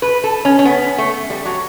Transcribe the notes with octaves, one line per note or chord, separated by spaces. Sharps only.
B4
A4
C#4
C#4
B3
A3
G3
F#3